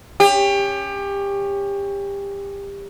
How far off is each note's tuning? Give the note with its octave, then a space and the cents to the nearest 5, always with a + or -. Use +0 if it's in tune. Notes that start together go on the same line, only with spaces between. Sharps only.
C#4 +10 G4 +25